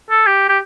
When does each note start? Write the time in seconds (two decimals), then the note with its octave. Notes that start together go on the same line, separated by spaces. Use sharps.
0.10 A4
0.27 G4
0.49 G4